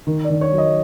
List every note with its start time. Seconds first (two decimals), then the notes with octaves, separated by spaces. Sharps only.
0.07 D#3
0.24 D5
0.30 D#3
0.41 C#5
0.52 F#3
0.58 D#5